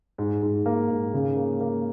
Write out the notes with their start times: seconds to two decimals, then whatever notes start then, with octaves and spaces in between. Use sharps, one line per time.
0.18 G#2
0.42 G#2
0.66 A#3
0.90 G#2
1.14 C#3
1.36 A#3
1.60 A#3